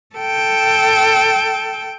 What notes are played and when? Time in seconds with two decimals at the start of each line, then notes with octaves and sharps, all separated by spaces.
0.16 A4 G5